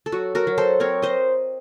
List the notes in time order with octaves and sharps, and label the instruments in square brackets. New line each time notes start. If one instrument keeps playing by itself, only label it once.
[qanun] A4
F#3 F#4
F#4 A#4
F#3
A4 C5
C4 A#4 C#5
C5 D#5